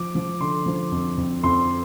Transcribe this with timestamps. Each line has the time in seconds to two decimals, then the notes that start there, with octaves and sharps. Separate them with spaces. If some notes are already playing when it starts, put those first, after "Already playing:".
Already playing: F3 D6
0.15 F3
0.40 D3 C6
0.66 F3
0.92 F2
1.17 F2
1.43 F2 C6